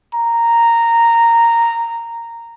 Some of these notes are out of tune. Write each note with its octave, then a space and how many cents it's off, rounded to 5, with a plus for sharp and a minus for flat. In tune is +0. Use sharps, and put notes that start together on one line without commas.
A#5 -10